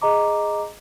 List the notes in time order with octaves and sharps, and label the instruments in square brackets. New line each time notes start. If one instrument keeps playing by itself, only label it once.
[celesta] G#4 D#5 A#5 D6